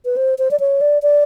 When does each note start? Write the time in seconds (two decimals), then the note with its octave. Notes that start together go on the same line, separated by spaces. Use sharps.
0.05 B4
0.17 C5
0.38 C5
0.51 D5
0.60 C#5
0.81 D5
1.02 D5